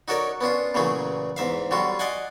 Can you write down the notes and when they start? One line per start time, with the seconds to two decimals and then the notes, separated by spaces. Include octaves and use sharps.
0.08 D#4 F#4 A4 A#4 C#5 D5
0.41 B3 C#4 D4 F4
0.74 A#2 C#3 E3 F#3 A3 G#4
1.37 E2 G#2 E5 F5
1.71 D3 F#3 G3 F4 F#4
1.99 D5 D#5 F5 F#5 G#5